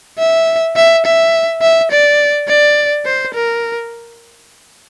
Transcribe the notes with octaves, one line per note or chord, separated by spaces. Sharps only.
E5
E5
E5
E5
D5
D5
C5
A#4